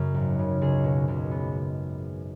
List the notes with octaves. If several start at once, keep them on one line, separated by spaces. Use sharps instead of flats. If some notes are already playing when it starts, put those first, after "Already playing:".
Already playing: F#2 C#3
G#1
C#3
C#2 G#4
B2
C#2
B3